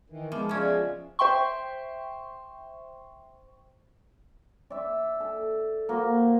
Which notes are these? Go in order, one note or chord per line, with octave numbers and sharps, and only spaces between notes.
D#3 E3
F3 G#3 B3 E5 D6
C#3 F3 G#3 C#4 D5 E5
C5 E5 G5 C6 C#6
D5 E5
A4
A#3 F#4 C5